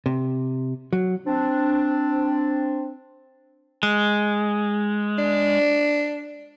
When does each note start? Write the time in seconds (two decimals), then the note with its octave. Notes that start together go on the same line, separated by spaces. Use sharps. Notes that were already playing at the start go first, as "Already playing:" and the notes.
0.06 C3
0.93 F#3
1.25 C4 D4
3.83 G#3
5.18 D4